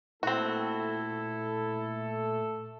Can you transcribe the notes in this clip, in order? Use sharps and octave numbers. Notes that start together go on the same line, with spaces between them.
A#2 A3 C4 E4 F#4 A4